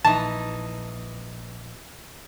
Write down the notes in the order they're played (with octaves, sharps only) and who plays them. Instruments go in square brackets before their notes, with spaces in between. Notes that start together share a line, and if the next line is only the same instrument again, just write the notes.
[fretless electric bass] A#1 [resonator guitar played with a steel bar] E3 D#4 [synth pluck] A5